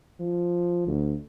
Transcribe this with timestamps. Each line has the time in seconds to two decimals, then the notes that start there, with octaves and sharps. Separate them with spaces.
0.20 F3
0.87 D2